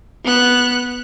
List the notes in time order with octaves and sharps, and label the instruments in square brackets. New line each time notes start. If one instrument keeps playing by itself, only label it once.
[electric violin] B3 F#6